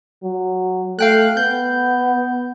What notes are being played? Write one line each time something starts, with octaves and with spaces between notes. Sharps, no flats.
F#3
A3 F5 G5 F#6
B3 G6